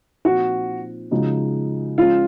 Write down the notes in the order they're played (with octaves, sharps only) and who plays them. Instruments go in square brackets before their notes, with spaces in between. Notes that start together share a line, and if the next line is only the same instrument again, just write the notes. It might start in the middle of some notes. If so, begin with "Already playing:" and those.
[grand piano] A#2 F3 C4 D#4 [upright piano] F#4
[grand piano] C#3 F3 G#3 D#4 F#4
[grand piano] F3 G#3 C#4 [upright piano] F4